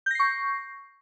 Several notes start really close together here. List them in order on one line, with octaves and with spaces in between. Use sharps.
G6 A#6 C7 C#6